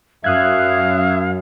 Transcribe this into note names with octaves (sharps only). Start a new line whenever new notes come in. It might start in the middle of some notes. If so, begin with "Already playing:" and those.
F#2 E5 F5 D#6 F#6 G#6